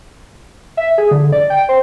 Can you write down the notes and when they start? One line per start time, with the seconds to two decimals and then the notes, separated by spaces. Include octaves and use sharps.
0.77 E5
0.98 G#4
1.11 D3
1.32 D5
1.50 G5
1.69 C5